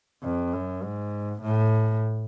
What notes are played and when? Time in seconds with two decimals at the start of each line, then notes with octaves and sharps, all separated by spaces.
0.24 F2
0.53 F#2
0.83 G#2
1.43 A2